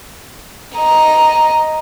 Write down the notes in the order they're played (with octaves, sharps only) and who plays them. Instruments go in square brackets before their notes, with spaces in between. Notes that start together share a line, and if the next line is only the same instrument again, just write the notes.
[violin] D#5 A#5